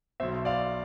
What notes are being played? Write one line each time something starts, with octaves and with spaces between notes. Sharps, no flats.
B1 B2 C5 E5
D5 F5